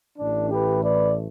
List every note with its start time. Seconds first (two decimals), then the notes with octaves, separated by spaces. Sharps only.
0.18 A1 A2 E3 A3 D4
0.50 G4 B4
0.83 B4 D5